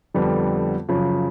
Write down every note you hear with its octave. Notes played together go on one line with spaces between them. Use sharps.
F2 D3 G3 B3
F#2 C#3 F3